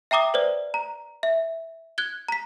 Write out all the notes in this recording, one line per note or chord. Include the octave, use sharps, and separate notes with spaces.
E5 G5 A#5 D6 D#6
B4 C5 D5
A#5
E5
F#6 G#6 G7
A#5 B6